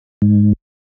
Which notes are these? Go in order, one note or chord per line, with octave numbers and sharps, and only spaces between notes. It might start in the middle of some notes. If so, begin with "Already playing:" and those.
G#2